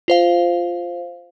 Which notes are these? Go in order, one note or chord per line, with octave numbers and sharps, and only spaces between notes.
F4 C5 F5